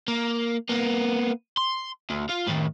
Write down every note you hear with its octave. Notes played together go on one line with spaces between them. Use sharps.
A#3
A#3 B3
C6
D2
F4
A2 D#3